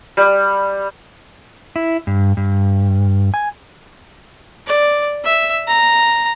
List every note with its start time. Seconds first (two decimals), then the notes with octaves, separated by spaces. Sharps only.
0.17 G3
1.76 E4
2.07 G2
2.37 G2
3.34 G#5
4.67 D5
5.24 E5
5.68 A#5